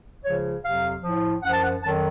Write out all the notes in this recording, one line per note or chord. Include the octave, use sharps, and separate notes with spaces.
C#2 C#3 F3 C#5
F2 C3 F#3 F5
A2 F3
F#2 F3 F#5
A5
F#5
F2 D#3 F#3 A5